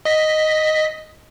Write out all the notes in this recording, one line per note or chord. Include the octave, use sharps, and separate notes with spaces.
D#5 B6